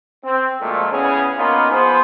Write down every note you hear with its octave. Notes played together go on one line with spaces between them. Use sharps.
C4
D2 A#2 F3 G#3 A3
E2 C#3 B3 C#4 G#4
A#3 B3 C#4 D#4 F4 A#4
F3 B3 G#4 C5